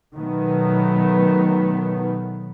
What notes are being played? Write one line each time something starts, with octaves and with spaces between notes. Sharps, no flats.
B2 D#3 F#3 A3 B3